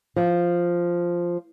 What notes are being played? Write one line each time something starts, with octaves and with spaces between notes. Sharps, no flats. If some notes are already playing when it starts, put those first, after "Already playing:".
F3